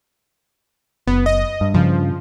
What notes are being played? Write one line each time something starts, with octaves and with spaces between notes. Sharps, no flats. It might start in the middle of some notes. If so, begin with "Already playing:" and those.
F#1 B3
D#5
G2
G2 C#3 F3